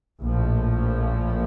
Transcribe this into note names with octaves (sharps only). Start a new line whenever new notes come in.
A#1 A2 F3